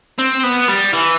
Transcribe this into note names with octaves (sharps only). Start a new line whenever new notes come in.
C4
B3
G3
E3